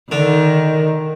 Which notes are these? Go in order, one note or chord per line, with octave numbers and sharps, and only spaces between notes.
D3 D#3